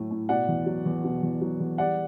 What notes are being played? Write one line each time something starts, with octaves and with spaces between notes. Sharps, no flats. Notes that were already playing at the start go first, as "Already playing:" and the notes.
Already playing: A2 F#3 A3
A2
B2 D5 F#5
E2
F#3
E2
B2
E2
F#3
E2
G3 D5 F#5